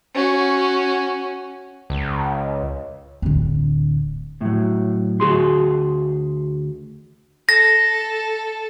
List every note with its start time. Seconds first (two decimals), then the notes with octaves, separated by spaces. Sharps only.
0.14 C#4 F#4
1.90 C#2
3.22 D1 D3
4.41 A2 F#3
5.20 D2 F#4 G#4 C6
7.49 A4 A#6